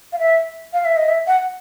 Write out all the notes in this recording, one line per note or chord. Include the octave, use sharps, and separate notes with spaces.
F5
E5
F5
E5
D#5
E5
F#5